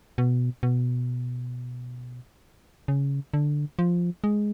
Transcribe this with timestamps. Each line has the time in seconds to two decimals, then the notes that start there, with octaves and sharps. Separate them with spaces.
0.18 B2
0.63 B2
2.88 C#3
3.34 D3
3.79 F3
4.24 G#3